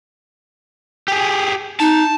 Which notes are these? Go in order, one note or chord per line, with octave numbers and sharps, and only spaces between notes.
G4 G#4
D#4 A5